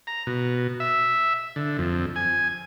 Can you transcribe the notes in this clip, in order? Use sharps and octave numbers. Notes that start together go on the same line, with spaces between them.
A#5
B2
E5
D3
F2
G#5